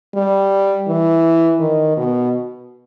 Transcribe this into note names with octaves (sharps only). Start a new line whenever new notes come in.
G3
E3
D#3
B2